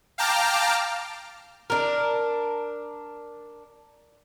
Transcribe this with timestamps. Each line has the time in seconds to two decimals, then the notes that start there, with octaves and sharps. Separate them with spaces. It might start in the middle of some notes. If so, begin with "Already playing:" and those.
0.18 F5 G5 A5 A#5 D6 F6
1.70 D4 A#4